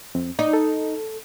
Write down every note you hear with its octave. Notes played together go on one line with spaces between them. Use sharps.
F2 C4
D#4 D5
A4